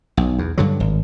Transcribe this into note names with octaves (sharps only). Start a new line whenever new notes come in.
B1
E2
G2 D3 F#3
G#1